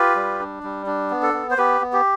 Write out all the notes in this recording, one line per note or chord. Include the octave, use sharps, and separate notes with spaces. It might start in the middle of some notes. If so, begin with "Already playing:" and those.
Already playing: F4 G4 B4
G3
D4
G3
D4
B3
A4
B3
C5
B3 G4 B4
B3
G4